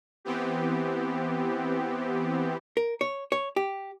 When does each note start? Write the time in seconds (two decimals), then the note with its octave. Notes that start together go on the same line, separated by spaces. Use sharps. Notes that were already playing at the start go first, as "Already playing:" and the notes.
0.25 E3 B3 C4 G4
2.77 A#4
3.01 C#5
3.32 C#5
3.56 G4